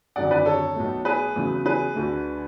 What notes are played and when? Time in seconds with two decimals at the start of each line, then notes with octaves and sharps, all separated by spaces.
0.16 G#1 F#2 D3 D5 F#5
0.31 B4 D5
0.46 A4 C#5
0.75 B1 B2 A3
1.05 G#4 B4
1.36 E2 C#3 F#3 A3
1.65 G#4 B4
1.95 D2 D3 A3